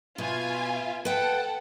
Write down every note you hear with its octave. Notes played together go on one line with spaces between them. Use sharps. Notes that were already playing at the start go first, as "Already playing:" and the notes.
B2 F4 E5 G#5
A4 B4 F#5 G5